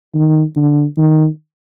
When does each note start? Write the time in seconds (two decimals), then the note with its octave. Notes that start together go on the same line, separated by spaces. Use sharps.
0.15 D#3
0.56 D3
0.98 D#3